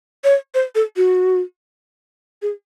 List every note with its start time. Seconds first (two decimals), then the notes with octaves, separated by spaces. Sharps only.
0.24 C#5
0.54 C5
0.75 A4
0.97 F#4
2.42 G#4